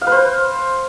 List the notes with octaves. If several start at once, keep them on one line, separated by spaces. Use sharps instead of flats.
F5
B4
C5